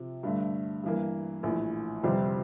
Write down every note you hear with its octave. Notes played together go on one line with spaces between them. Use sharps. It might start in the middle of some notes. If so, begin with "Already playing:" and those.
Already playing: C3 F3
G2 D3 A3
G2 E3 A#3
A#1 A2 E3
G1 F2 C3 G3 C4